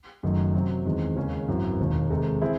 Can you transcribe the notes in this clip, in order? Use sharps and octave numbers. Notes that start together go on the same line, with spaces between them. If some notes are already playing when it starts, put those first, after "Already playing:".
F#1 F#2 D#3 F#3 A3
C3 F#3 C4
E2 D#3 G#3 C4
D#2 C#3 G#3 C#4
G#1 F#2 E3 C4 F#4
E1 D#2 D#3
C3 D#3 G#3 D#4 A4
E3 C4 E4 G#4